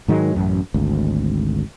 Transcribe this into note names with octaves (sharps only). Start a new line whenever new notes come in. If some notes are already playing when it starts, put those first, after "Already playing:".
G#2 D#3 F#3 G#3
A1 F#2
G#1 D2